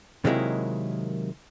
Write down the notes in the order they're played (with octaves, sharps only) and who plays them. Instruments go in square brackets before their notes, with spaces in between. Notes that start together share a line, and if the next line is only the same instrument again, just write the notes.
[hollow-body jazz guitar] C3 D#3 F#3 G#3 A#3 E4